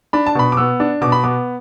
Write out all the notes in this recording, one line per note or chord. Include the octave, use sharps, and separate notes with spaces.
D4 B5
A5
B2 B5
D6
B3 E6
D4
B2 D6
B5
B3 D6